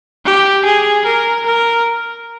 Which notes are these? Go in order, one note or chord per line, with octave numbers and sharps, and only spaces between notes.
G4
G#4
A#4
A#4